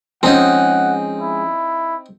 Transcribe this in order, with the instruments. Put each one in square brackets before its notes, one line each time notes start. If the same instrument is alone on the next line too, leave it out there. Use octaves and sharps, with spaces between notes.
[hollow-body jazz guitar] F3 C#4 [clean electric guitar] G#3 G#4 [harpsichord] C4 D#4 [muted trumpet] F#5
[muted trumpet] E4